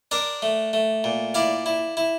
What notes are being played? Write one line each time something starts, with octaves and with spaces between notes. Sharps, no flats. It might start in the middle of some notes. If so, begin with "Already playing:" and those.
D4 A#4 D5
A3
A3
A#2
E4 D5 F5
E4
E4